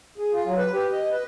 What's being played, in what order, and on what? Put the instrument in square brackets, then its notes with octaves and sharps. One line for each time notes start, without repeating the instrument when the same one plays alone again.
[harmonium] G#4
F4
F#3
B4
G4
D#5
B4